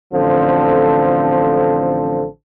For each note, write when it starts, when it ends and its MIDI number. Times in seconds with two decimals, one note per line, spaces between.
0.14 2.26 33
0.14 2.26 50
0.14 2.26 53
0.14 2.26 60
0.14 2.26 69